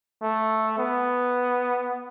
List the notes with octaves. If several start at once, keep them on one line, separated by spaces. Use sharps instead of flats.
A3
B3